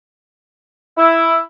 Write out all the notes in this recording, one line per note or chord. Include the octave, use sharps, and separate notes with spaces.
E4